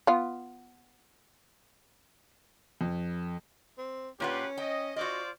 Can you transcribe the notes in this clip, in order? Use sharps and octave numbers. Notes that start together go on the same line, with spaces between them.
B3 F4
F2
C4
A#2 C#4 F4 G4 B4 F#5
D#5 G5
F4 F#4 C5 D5 D#5